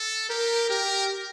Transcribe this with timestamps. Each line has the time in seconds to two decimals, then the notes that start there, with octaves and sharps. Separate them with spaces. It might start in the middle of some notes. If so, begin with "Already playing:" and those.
Already playing: A4
0.29 G4 A#4
0.70 G4 A#4